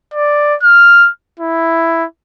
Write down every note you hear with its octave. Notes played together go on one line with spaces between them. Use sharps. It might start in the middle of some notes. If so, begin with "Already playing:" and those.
D5
F6
E4